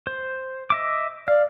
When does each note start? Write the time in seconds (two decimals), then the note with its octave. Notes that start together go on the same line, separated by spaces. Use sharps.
0.07 C5
0.70 D#5 E5 D6
1.28 D5 F5